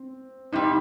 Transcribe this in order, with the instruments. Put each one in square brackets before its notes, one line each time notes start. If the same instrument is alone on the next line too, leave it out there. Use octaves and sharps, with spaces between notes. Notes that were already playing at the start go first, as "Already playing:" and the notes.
Already playing: [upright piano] C4
[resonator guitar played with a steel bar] F2 C3 G3 [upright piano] D#4